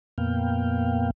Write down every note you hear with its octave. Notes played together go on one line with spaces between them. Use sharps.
F2 A#2 A#3 B3 F5 G5